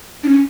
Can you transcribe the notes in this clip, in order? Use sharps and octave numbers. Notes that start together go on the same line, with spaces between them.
D4
C#4